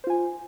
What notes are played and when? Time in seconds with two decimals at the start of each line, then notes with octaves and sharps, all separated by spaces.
0.04 C5
0.07 F4
0.10 G#5